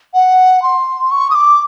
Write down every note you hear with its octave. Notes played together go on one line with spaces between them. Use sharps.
F#5
C6
C#6
D#6
D6